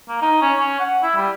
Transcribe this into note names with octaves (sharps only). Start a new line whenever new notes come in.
A#3
D#4
C#4
C#4
F#5
E4
G3